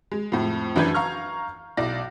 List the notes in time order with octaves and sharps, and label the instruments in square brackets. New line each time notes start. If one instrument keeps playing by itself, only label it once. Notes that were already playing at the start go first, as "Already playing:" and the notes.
[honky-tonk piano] G#3
F2 A2
F#2 E3 D4 B4 G6 G#6
F5 A#5 C#6 F6
B1 E4 D5 A#6